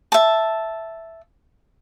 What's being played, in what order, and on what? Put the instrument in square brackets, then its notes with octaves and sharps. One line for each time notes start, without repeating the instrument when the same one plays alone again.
[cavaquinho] E5 A5